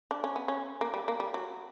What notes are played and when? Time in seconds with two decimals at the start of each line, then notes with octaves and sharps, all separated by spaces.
0.11 D4
0.24 C#4
0.36 B3
0.48 C#4
0.81 A#3
0.94 G3
1.08 A#3
1.20 G3
1.34 F#3